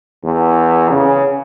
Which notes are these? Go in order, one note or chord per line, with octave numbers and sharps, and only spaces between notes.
E2
C#3